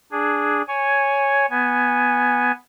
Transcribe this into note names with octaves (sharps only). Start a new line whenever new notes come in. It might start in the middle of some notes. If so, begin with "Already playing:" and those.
D4 G#4
C#5 G#5
B3 G#5